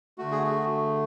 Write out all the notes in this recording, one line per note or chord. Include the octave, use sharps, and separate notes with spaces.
D3 A3 F#4
G#4
F#4